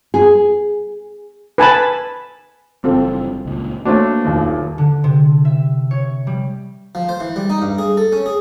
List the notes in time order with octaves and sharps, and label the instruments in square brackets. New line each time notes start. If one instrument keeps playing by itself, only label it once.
[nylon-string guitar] G#4
[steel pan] B4 G#5 A5 B5
[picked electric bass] F#1 E3 G3 [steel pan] C4 F4 A4
[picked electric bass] C#2 A#2
[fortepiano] A3 D4 [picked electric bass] A#3 [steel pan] F#4 C5 C#5
[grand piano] D#1 D#2
[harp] D3
C3
E5
C#5
G3
[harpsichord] F3
C5
E3
G3
D#4
G2
G#4
A4
C#4
G#4